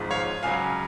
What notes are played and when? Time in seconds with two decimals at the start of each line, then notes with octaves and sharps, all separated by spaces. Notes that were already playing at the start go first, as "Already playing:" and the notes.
Already playing: G#1 G#2 F3 G#3
0.11 C#5 F5
0.43 C#2 C#3 F#3 F5 G#5